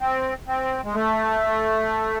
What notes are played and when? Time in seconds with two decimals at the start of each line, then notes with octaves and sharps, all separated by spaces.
0.01 C4
0.48 C4
0.85 G#3
0.94 A3